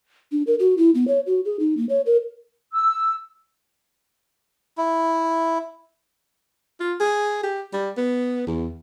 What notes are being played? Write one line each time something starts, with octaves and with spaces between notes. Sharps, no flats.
D4
A#4
F#4
E4
B3
C#5
F#4
G#4
D#4
A#3
C#5
A#4
E6
E4
F4
G#4
G4
G3
B3
E2